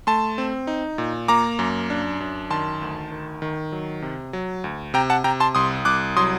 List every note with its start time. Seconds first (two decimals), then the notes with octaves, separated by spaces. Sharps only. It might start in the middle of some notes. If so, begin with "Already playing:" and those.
0.07 A3 A5 C6
0.38 C4
0.67 D#4
0.98 A#2
1.28 A#3 A#5 D6
1.59 F#2
1.90 D4
2.20 F#2
2.50 D#3 A5 C6
2.82 D2
3.12 D#3
3.42 D#3
3.72 F#3
4.02 C3
4.33 F#3
4.64 D2
4.94 C3 G5 A#5
5.10 F#5 A5
5.24 C3 G5 A#5
5.40 A5 C6
5.55 C2 C6 D#6
5.85 C2 D6 F#6
6.16 F#3 C6 D#6